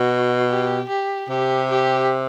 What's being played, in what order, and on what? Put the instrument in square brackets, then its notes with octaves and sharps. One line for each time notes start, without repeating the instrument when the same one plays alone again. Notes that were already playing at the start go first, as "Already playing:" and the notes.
Already playing: [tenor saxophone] B2 [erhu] F#4
[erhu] G4
G4
[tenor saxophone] C3 [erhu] G4
[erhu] G4